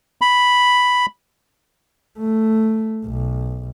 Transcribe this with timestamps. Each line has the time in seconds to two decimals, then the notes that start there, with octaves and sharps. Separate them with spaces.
0.21 B5
2.18 A3
3.05 B1